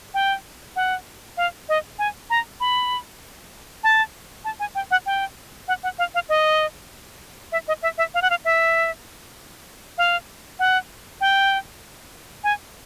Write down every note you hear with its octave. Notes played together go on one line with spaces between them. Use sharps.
G5
F#5
F5
D#5
G#5
A#5
B5
A5
A5
G#5
G5
F#5
G5
F#5
F#5
F5
F5
D#5
E5
D#5
E5
E5
F5
F#5
F5
E5
F5
F#5
G5
G#5